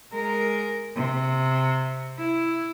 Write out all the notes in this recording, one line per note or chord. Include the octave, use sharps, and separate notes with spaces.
G#3 A#4
C3
E4